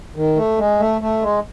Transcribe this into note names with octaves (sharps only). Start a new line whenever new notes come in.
D#3
A3
G#3
A3
A3
G#3